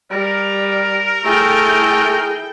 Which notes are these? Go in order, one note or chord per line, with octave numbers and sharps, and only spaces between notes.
G3 A#4
A3 E4 G#4 A4 G5